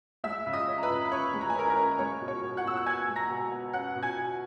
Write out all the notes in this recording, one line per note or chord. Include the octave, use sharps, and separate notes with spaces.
G#3 E5 E6
C#3
D#5 D#6
C#4
A#5
B4 B5
C#3
B5
C#4 C#5 C#6
G#3
A#5
G#5
C#4 A#4 A#5
A#4 A#5
C#4
G#3 C#5 C#6
B2
C#5 C#6
B2
F#5 F#6
B2 E6
F#6
B3 G#5 G#6
G#3
A#5 A#6
B2
B3
C#4 F#5 F#6
B2
G#5 G#6
B2